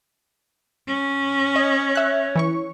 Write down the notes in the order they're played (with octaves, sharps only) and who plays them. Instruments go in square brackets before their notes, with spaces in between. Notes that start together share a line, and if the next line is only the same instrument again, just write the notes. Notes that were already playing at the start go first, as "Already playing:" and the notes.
[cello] C#4
[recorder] C#5 [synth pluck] D#5
[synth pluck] E5 F#6
E3 C#5 C#6